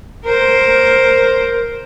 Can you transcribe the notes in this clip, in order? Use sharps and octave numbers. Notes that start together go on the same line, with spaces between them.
A#4 C5